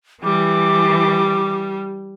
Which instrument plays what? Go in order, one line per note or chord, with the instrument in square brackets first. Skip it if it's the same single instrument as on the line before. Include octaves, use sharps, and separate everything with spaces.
[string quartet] E3 [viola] G3 [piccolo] D6